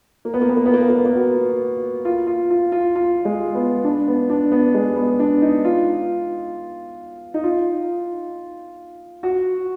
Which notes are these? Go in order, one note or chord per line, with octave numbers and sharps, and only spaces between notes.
A#3
B3
A#3
B3
A#3
B3
A#3
B3
A#3
B3
A#3
F#4
F4
F4
F4
F4
F4
G#3
B3
D4
B3
D4
B3
G#3
B3
D4
D#4
F4
D#4
F4
F#4